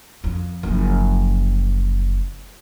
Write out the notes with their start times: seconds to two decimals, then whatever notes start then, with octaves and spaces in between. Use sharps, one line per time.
0.24 F2
0.63 F#1 F3